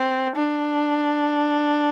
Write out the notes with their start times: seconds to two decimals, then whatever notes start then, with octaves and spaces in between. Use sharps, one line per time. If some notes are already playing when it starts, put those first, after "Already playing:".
Already playing: C4
0.36 D4